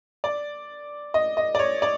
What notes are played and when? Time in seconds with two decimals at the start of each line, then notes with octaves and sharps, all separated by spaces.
0.24 D5
1.14 D#5
1.37 D#5
1.55 D5
1.59 C#5
1.82 D5